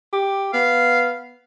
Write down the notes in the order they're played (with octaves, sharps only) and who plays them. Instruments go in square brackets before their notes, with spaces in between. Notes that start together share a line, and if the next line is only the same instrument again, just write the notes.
[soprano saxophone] G4
[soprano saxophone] B3 [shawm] F5